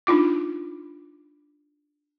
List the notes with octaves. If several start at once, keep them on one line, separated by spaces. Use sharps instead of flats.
D4 D#4 F4 D6